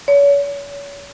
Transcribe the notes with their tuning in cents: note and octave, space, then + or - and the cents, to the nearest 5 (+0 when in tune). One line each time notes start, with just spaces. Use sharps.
C#5 +35